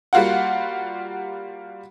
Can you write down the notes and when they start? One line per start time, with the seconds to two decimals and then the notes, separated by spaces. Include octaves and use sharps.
0.13 G3 A#3 F4 F#4 F#5